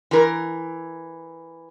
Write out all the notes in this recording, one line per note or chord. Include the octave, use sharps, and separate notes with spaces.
E3 A#4